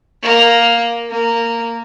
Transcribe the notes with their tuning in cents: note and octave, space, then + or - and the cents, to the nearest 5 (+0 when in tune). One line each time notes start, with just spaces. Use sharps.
A#3 +5
A#3 -10